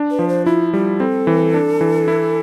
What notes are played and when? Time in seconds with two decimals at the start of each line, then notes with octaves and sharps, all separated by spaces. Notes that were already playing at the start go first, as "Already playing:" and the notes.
Already playing: D4
0.11 B4
0.19 F3
0.29 C5
0.46 E4 F4
0.73 G3 F4
1.00 C4 A4
1.27 E3
1.54 D4
1.81 E3
2.08 E4